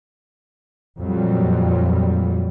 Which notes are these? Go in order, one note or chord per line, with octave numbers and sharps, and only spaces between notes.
F2 A#2 F#3 G3